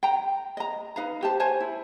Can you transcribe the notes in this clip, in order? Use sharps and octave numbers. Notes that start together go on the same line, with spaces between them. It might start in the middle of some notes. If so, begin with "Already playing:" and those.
G5 A#5
D#5 A#5
D#4 B4 F5 A#5
G4 C5 A5
C5 C#5 G#5 A5
E4